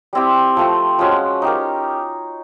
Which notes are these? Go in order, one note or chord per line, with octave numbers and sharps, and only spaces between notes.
G3 C4 E4 G4
F3 A3 C4
F3 G#3 C#4 F#4
D#4 G4 A#4